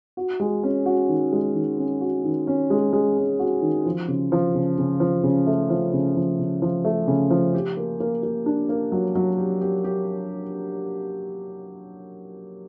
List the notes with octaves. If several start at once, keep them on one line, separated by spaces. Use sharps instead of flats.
F#4
G#3
C#4
F#4
D#3
G#3
D#3
C#4
F#4
D#3
C#4
G#3
G#3
C#4
F#4
D#3
F3
C#3
F3
C#3
C#3
F3
C#3
A3
F3
C#3
F3
C#3
F3
A3
C#3
F3
G4
A#3
A#3
A#3
D4
A#3
F#3
F#3
G4
G4
G4